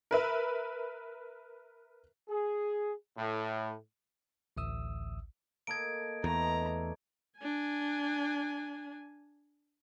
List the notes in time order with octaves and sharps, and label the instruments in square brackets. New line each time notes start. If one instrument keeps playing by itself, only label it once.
[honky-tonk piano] A#4 B4 E5
[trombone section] G#4
A2
[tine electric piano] A1 D2 E5 D#6 E6
[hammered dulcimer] A#3 A4 D#5 [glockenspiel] G#6 D7
[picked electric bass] E2 [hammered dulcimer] A3 B3 D#4 [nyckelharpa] A#5
[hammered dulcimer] D4
[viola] D4 G#5